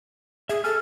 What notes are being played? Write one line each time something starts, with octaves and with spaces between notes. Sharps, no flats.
G#4 E5
A4 G#5 F6